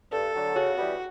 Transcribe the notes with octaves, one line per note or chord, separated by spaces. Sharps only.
G2 A4
D3 F#3
C#3 F#4
E3 G3 B3